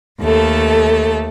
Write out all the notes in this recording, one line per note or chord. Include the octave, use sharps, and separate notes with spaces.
D#2 A3 A4